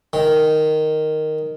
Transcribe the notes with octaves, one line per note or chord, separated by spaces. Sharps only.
D#3